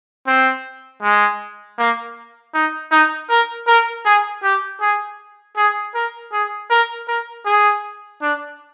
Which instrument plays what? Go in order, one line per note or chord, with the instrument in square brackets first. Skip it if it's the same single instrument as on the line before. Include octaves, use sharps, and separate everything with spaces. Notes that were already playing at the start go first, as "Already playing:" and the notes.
[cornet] C4
G#3
A#3
D#4
D#4
A#4
A#4
G#4
G4
G#4
G#4
A#4
G#4
A#4
A#4
G#4
D4